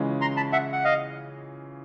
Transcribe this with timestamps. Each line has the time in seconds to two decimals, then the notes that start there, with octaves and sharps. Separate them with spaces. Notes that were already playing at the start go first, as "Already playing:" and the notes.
Already playing: C#3 E3 G#3 C#4 F4
0.21 A#5 C6
0.37 A5 B5
0.52 E5 F#5
0.73 F#5
0.84 D#5 F5